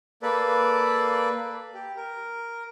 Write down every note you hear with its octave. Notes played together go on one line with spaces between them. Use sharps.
A#3 A4 B4 D5
G4
A#4